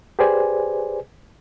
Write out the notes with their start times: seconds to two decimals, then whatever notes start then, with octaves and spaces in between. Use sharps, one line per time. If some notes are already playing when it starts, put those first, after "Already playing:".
0.19 G4 G#4 B4 C5 D5 G#5